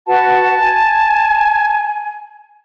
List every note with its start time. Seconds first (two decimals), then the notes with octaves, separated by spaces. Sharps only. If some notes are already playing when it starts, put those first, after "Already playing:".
0.07 F#4 B4 F#5 A5
0.60 G#5